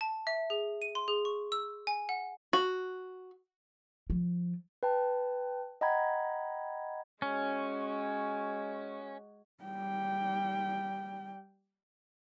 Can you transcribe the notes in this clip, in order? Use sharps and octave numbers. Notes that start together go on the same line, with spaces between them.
A5
E5
G#4
D#7
C6
G#4
C#6
E6
G#5
F#5
F#4
F3
B4 G5 A5
D#5 F#5 G5 A#5 B5 G#6
G#3 C#4 F#4
G3 G5